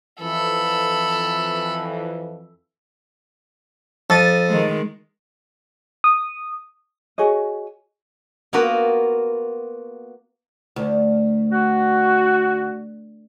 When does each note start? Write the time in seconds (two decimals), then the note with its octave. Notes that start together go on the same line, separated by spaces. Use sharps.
0.21 F2 E3 A4 B5
4.10 F2 A4 A6 D#7
4.49 D#3 G#3
6.04 D#6
7.18 F#4 G#4 C#5 D#5
8.53 A#3 B3 F4 F#4 A#4 B4
10.76 D2
11.51 F#4